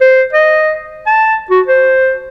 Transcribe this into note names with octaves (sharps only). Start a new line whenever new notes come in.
C5
D#5
A5
F#4
C5